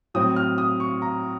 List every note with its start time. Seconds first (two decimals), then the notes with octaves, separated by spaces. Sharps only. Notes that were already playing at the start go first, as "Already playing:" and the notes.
0.14 A2 F#3 C4 D#6
0.36 F6
0.58 D#6
0.80 C#6
1.02 A#5